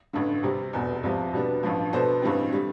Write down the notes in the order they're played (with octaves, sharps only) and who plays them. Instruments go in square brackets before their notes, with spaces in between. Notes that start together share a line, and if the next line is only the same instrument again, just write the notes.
[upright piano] A1 G2 D3
C3 G3 C4
F1 E2 B2
C2 C3 F3
B2 G3 B3 D4
A1 G2 F3
B2 B3 D4 A4 C5
A1 G2 E3 G3 C4
D3 G3